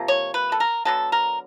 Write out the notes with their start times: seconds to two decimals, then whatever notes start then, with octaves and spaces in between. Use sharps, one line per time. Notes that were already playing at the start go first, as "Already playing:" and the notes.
Already playing: C3 F3 A#3
0.08 C#5
0.34 B4
0.52 A4
0.60 A#4
0.85 D3 F#3 B3 A4
1.12 A#4